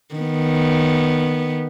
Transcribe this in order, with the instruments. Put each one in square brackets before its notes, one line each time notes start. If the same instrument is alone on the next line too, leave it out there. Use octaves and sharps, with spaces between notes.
[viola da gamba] D#3 B3